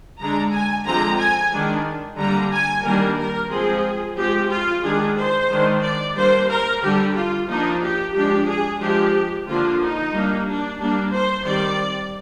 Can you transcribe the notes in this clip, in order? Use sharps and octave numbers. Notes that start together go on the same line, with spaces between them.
D3 G#3 D4 A#5
G#5
D3 F3 G#3 C4 A#5
G#5
D#3 G#3 D4
D3 G3 A#3 D4 A#5
G#5
D#3 G3 A#3 D4 A#4
A#4
F3 G#3 C4 G#4
F3 G#3 C4 G4
F4
D#3 G#3 D4 G#4
C5
D#3 G#3 D4
D5
G3 A#3 D4 C5
A#4
D3 G3 D4 G4
F4
F3 A#3 D4 D#4
G4
F3 G#3 D4 G4
G#4
F3 G#3 D4 G4
D3 F3 A#3 D4 F4
D#4
G3 A#3 D4
D4
G3 A#3 D4
C5
D#3 G3 C4 D5